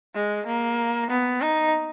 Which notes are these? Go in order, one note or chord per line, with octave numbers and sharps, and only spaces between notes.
G#3
A#3
B3
D#4